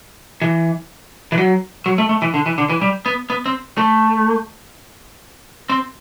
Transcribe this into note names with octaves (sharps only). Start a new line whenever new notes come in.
E3
E3
F#3
F#3
A3
A3
E3
D3
E3
D3
E3
G3
B3
B3
C4
A3
C4